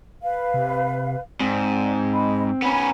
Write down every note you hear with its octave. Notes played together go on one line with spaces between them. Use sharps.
B4 F5
C3
G#2 C4 D5
D#5 B5
B3 C#4 G#5 A#5 B5